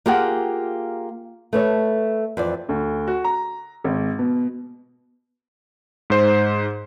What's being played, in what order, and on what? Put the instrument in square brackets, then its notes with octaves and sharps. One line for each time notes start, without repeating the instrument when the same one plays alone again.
[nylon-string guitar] A#3 F4 G4 G#4 F#5
A3 B4 C#5
F2 E3 D5
[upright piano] D2
F#4
A#5
G#1
B2
[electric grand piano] G#2 C5 C6